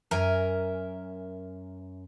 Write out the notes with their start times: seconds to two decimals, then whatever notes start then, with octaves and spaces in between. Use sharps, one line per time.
0.11 F#2 A#4 E5 G#5